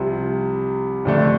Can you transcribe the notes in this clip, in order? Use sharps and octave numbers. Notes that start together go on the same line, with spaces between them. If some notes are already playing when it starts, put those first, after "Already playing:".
Already playing: C2 C3 F3
F2 D3 A3 D4